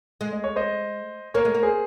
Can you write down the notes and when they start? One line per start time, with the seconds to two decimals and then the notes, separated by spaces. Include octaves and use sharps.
0.21 G#3
0.32 D#5
0.44 C#5
0.56 C5 D#5
1.34 A#3 A#4 C#5
1.45 G#3
1.55 A#3
1.63 G#4 C5